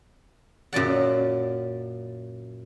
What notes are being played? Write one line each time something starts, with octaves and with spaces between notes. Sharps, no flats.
F#2 A#2 D5 F#5